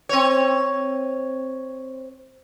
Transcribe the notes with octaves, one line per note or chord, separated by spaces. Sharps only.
C4 C#5